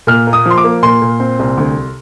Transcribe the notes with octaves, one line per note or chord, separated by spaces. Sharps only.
A#2 F6
A#3
D#6
F3 C6
D6
A#3
A#2 C6
A#2
C4
C2
D2